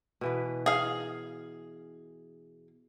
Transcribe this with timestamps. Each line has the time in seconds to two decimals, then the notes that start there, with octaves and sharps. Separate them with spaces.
0.21 B2 E3 B4
0.66 G#4 F5